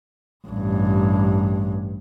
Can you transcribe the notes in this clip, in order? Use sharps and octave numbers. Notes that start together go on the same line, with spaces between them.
A1 G2